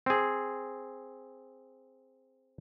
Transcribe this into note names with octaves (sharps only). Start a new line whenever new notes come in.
C4 G#4